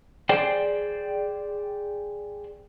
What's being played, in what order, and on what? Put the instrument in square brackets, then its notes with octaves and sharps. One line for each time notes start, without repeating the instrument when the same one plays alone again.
[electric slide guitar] G#4 C5 D5 G5